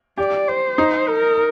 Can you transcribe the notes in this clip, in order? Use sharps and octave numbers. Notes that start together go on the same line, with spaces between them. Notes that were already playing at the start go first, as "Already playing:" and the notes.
G4 D5
C5
D#4
A#4